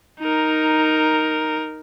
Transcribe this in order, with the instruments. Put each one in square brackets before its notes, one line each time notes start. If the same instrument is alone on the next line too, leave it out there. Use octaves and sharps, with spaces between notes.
[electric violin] D#4 A#4